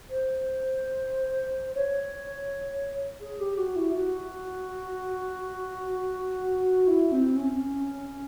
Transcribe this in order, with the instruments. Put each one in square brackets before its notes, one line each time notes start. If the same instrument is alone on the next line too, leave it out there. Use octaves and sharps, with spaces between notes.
[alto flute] C5
C#5
G#4
G4
F#4
E4
F#4
E4
C4
C#4